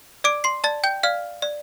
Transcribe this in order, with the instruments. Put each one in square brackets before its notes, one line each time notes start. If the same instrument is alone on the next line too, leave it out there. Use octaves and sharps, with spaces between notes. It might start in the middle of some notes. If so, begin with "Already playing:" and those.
[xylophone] D5 D6 D7
C6 C7
D5 A5 A6
G5 G6
D5 F5 F6
D5